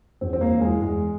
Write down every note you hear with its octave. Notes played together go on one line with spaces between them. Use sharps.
E2 C4
E1 C4
A#3
E1
G#3
E3
E2 G#3